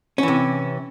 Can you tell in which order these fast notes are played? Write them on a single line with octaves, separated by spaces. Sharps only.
C#4 E3 C3